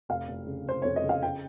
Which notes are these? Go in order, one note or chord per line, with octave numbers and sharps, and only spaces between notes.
F1 F5
F1
C#3
F1 C5
F2 C#5
D#5
C#3
F5
G5